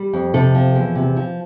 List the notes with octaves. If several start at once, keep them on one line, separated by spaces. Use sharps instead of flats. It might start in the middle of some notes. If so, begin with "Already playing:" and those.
Already playing: G3
F2
C3 A4
F3
E2
C3
F3